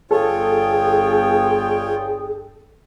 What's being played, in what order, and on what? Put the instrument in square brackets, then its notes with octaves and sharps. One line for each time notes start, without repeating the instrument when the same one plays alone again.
[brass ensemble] G1 D3 G5 [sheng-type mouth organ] F4 C#5 [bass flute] G#4 [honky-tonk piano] A4